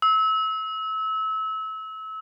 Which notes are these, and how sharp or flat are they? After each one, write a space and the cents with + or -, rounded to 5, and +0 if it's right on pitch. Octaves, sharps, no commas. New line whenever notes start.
E6 -30